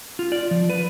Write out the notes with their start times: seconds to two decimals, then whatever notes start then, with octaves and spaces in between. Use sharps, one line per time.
0.19 F4
0.32 D5
0.51 F3
0.69 B4